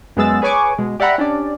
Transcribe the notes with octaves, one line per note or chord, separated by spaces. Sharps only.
F#2 G#3 B3 G#4 E6 A6
G#4 B4 C#5 G#5 C#6 D6
B2 G#3
G4 D5 E5 F#5 A#5 B5
C#4 D4 G4 D5